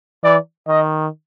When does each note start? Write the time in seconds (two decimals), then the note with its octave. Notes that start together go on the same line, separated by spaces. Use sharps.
0.23 E3 D5
0.68 D#3 D#5